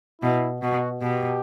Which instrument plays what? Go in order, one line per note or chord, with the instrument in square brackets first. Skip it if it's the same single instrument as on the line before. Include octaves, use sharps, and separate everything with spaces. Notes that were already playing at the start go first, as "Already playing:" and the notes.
[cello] B2 [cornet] E4
[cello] B2 [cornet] F#4
[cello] B2 [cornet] G4